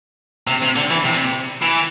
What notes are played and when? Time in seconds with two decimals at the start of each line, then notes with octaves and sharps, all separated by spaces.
0.47 C3
0.63 C3
0.76 D3
0.91 E3
1.05 C3
1.62 E3